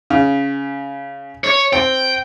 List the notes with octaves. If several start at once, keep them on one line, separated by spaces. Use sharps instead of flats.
C#3
C#5
C4 G5